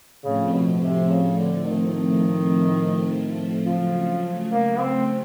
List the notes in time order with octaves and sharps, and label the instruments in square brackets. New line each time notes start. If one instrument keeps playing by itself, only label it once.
[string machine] A2 F3 A3 C4 [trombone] C#3
[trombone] B2
C3
C#3
D3
D#3
[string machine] C#3 F#3 A3 [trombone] F3
[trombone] A#3
C4